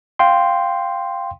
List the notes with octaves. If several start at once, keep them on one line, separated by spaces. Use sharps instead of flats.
F5 G5 C6